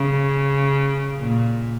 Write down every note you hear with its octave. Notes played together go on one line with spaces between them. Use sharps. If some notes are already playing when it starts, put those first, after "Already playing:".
Already playing: C#3
A#2